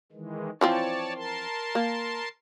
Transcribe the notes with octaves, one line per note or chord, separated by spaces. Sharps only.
D#3 E3 G#3
E3 F3 C4 C#5 D5 A5
A#4 A5 C6
A#3